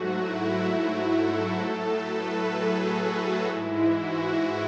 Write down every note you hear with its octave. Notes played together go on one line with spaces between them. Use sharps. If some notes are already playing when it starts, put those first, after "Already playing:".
Already playing: G#2 F#3 A3 F#4
E4
F#4
A4
A2 F#3 A3 A4
B4
G#4
F#4
G#2 E3 G#3 E4
F#4